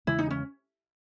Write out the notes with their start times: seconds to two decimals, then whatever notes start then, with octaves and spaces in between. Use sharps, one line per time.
0.07 E2 C#3 E3 G#3 E4
0.19 D#4
0.30 C#4